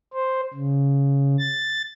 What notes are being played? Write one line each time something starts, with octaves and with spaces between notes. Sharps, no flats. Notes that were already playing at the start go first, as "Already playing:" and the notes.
C5
C#3
A6